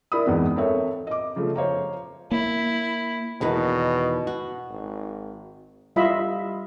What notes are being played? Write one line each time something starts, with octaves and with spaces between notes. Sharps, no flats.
E4 A#4 D5 B5 D#6
E2 G#2 G#3 B3 C4
C4 A4 A#4 C#5 E5
D#5 D6
C#3 F3 A3
C5 C#5 F5 A#5
A#3 E4
E2 B2 D#3 B4
F#4
G#1
G3 E4 F4 D#5 E5 B5